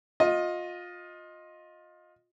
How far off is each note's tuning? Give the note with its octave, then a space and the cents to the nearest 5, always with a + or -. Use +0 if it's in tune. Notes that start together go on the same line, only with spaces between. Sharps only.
F4 +25 D#5 +5